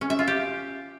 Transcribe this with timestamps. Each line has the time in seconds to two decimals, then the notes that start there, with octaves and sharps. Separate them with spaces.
0.01 C#4
0.10 E5
0.19 F4
0.28 G4